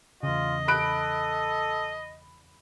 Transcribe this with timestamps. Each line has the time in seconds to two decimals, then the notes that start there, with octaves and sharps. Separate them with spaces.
0.23 E2 C#3 F4 D#5
0.68 A4 B5 F#6 D7